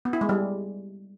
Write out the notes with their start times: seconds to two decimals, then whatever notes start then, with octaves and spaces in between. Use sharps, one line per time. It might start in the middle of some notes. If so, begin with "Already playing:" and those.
0.05 B3
0.13 E4
0.21 G#3
0.29 G3